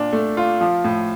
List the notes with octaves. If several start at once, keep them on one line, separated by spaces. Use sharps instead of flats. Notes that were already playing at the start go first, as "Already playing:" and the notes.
Already playing: A#2 D4
A3
F4
F3
A2